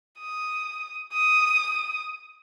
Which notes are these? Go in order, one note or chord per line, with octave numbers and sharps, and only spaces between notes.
D#6
D#6